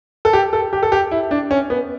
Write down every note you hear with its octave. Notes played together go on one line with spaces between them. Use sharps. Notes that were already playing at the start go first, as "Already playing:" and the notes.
A4
G4
A4
G4
A4
G4
E4
D4
C#4
B3